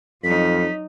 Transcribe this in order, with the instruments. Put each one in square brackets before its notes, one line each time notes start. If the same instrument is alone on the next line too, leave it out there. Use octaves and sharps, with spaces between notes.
[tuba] F2 [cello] F#3 D#4 [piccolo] B6